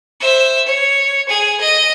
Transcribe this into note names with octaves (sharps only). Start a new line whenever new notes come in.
C5 E5
C#5
G#4
D#5